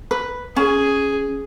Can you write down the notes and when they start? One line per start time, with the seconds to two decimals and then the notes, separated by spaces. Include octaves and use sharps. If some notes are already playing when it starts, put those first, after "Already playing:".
0.11 B4
0.56 C#4 G#4